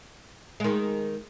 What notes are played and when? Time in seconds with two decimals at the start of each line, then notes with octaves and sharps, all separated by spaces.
0.60 D#3 G#3